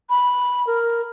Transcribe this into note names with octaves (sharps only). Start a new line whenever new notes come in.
B5
A#4